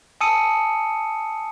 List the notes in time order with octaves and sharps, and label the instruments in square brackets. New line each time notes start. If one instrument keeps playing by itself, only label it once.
[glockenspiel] G#5 A5 D#6 E6 C#7 D#7